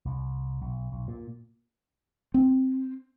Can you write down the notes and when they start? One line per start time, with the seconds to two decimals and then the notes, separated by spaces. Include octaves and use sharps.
0.06 C2
0.62 B1
0.92 B1
1.08 A#2
2.34 C4